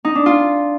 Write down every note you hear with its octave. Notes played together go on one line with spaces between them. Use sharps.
D#4
D4
F4